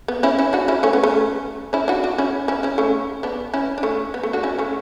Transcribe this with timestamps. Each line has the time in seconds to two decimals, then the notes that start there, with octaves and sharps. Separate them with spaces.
0.08 B3
0.23 C#4 E4
0.38 C#4 E4
0.53 D4 F#4
0.68 C#4 E4
0.83 A3 C#4
0.93 B3
1.03 A3 C#4
1.73 C#4 E4
1.88 D4 F#4
2.03 D4 F#4
2.18 C#4 E4
2.48 C#4 E4
2.63 C#4 E4
2.78 A3 C#4
3.23 B3 D4
3.54 C#4 E4
3.78 D4
3.83 A3 C#4
4.14 B3
4.23 A3
4.33 D4 F#4
4.43 C#4 E4
4.58 A3 C#4